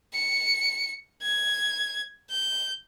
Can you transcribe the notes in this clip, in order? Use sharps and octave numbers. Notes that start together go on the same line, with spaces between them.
C#7
G#6
G6